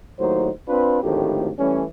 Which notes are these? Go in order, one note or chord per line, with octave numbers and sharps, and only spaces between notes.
D#2 A2 F#3 D#4 C5
C4 D4 F4 B4
G#1 D2 A2 D#3 F3 G4
E3 G3 A3 C#4